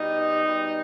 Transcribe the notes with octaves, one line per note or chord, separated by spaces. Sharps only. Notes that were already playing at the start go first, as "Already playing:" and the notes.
Already playing: B2 G3 D#4
B2 G3